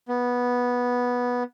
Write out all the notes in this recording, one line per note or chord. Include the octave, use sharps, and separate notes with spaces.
B3